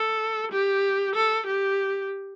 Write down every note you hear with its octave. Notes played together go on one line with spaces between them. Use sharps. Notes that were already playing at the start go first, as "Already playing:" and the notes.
Already playing: A4
G4
A4
G4